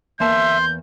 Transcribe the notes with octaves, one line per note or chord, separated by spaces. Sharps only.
E2 A#3 E5 A5 C6 G6